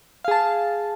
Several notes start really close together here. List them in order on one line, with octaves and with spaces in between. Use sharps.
F5 G#4 A5